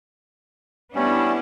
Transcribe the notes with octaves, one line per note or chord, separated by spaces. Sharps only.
G3 B3 C#4 D4 E4